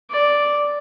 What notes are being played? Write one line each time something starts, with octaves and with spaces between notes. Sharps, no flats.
D5